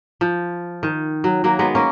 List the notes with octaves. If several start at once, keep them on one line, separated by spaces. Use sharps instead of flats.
F3
D#3
F#3
F#3 A#3
G#3 B3
A#3 C#4